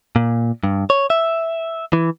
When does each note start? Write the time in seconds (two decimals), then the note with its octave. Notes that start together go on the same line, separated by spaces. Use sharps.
0.16 A#2
0.63 G2
0.90 C#5
1.10 E5
1.93 E3